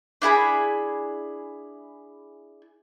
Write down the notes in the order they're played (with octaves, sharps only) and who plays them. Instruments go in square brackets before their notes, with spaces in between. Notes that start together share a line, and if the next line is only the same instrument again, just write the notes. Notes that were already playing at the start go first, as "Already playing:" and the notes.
[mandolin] D4 E4 G#4 B5